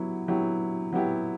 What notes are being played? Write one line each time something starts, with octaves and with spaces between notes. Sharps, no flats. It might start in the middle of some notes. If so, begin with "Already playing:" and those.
Already playing: F#3 B3 E4 G4
F#3 B3 E4 G4
F#3 B3 E4 G4